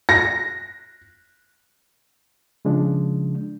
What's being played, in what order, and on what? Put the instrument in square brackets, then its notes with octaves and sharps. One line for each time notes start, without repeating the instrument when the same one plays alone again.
[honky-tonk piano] A#6
[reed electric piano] C#3 F3 G#3 D4